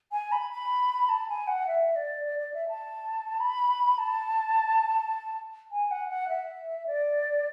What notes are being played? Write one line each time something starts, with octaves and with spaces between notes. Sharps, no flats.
G#5
B5
B5
A5
G#5
F#5
E5
D5
D5
D5
E5
A5
B5
A5
G#5
F#5
F#5
E5
D5